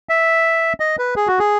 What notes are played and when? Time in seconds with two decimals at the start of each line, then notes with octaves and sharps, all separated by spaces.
0.09 E5
0.80 D#5
0.98 B4
1.16 G#4
1.27 F#4
1.39 G#4